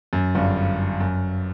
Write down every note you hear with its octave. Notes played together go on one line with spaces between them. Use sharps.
F#2
G1 G2
F#2